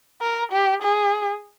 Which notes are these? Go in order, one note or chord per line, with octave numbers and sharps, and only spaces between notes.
A#4
G4
G#4